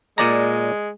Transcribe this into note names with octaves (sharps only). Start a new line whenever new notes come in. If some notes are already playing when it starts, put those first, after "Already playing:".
A#2 G#3 D5 A#5